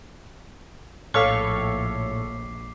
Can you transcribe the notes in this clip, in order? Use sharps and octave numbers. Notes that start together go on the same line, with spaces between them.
A#1 A2 A4 C#5 F5 D6 B6 C7